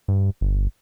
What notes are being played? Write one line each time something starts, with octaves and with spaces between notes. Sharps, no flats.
G2
G1